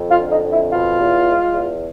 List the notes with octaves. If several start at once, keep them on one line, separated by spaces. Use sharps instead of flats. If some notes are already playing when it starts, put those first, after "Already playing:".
Already playing: F2
F4
D3
D#4
F2
E4
B2 F4
E2
G#3
E2